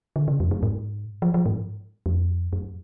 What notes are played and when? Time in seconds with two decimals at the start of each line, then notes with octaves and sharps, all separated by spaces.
0.16 D3
0.28 C#3
0.40 F2
0.51 F#2
0.63 G#2
1.22 F3
1.34 F3
1.46 G#2
2.06 F2
2.53 F#2